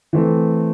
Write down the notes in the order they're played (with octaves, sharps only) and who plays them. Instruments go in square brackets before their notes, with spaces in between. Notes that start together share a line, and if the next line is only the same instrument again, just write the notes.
[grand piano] E3 A3 C4